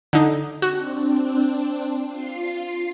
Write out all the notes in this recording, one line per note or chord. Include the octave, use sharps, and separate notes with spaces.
D3 D#4
C4 D4 F#4
F4 C7